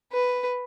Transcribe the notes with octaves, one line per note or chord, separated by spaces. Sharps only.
B4